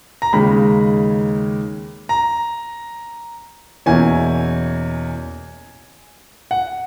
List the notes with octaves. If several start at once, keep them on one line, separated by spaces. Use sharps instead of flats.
A#5
D#2 C#3 G#3 D#4 B5
A#5
E2 B2 A#3 C#4 E4 G#5
F#5